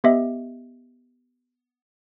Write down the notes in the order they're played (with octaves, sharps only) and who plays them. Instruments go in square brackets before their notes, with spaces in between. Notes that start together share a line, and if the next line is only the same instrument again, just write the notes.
[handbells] B3 G4 D#5 E5